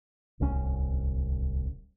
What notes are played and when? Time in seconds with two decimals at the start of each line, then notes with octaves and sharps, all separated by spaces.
0.40 D1 C2 D3 C#4